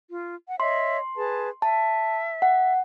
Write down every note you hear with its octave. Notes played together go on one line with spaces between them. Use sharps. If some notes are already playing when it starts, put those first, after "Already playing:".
F4
F#5
C#5 D#5 E5 C6
G#4 B4 A5
E5 A5
F#5